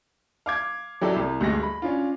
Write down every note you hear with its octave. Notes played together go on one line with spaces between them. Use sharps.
F5 D6 G#6
F#3 E4 G4 A4 D5
C2
D2 G2 G#3 A#6
B5
C#4 D4 F4